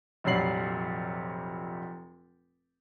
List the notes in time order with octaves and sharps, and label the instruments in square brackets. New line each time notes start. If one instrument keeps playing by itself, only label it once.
[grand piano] F1 A#1 F#3 G3 C7 F#7